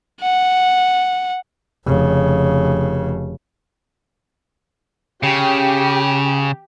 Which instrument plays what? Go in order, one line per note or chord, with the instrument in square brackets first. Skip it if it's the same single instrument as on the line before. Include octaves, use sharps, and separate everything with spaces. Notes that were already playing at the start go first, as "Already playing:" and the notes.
[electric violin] F#5
[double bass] F1 C#3
[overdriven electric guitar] C#3 [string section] G4